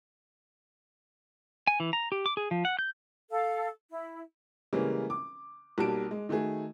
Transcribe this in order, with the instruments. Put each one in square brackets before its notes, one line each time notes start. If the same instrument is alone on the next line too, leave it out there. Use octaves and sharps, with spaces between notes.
[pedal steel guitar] G#5
E3
A#5
G4
D6
G#4
F3
F#5
G6
[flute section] A4 F5
E4
[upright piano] C#3 E3 G3 G#3 A#3 C#4
D6
B1 G3 A#3 F#4 A5 D7
G#3
D#3 A3 F#4 G#4